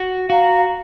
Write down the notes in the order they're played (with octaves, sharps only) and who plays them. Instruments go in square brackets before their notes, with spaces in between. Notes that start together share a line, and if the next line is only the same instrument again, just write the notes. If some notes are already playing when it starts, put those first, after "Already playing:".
Already playing: [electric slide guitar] F#4
[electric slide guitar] F#4 [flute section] F5 A#5